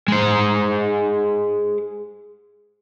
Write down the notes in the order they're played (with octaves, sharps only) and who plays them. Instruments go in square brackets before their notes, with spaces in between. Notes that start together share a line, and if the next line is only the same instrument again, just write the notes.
[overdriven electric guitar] G#3 C5